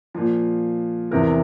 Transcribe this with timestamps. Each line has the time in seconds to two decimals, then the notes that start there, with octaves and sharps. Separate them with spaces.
0.14 A#2 F3
1.11 E2 C3 E3 A#4